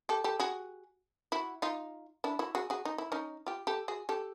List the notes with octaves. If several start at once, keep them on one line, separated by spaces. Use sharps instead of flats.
G4 A4
G4 A4
F#4 G#4
E4 F#4
D#4 F4
D4 E4
E4 F#4
F#4 G#4
F#4 G#4
D#4
E4
C#4 D#4
F4 G4
G4 A4
F#4 G#4
G4 A4